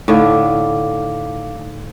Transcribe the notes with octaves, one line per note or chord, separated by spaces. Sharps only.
A2 D3 D#4 F5 D6